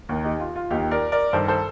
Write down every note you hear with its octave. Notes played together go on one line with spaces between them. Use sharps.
D#2 D#3
D#4 G4
F4
F4
D#2 D#3 D#4 G4
A#4 D5
A#4 D5
G2 D#3 A4 C5
A4 C5